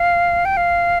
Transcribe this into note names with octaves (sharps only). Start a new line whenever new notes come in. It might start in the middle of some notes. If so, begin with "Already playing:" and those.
Already playing: F5
G5
F5